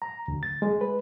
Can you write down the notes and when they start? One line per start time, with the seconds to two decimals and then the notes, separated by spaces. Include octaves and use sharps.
0.02 A#5
0.28 D2
0.43 A6
0.62 G#3
0.81 B4